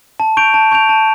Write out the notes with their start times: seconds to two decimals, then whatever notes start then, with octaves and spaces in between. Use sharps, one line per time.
0.20 A5
0.37 C#6 G6 D7 F7
0.54 A5
0.71 C#6 G6 D7 F7
0.89 A5